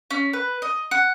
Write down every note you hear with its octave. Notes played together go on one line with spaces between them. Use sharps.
C#4
B4
D#5
F#5